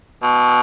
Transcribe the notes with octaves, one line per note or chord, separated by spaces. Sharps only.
B2